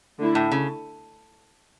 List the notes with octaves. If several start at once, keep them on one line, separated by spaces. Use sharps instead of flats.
D3 A3 E4
A2
C#3